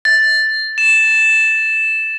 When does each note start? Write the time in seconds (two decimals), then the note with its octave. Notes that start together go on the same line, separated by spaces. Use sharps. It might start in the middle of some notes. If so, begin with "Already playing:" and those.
0.05 A6
0.78 E7